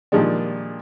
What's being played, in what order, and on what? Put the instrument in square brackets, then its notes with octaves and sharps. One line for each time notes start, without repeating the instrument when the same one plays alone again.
[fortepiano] A#2 D#3 F3 G3 G#3 D4